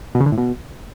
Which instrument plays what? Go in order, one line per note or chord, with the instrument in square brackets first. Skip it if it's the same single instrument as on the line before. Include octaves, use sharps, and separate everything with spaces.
[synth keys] B2
C#3
D3
A2
B2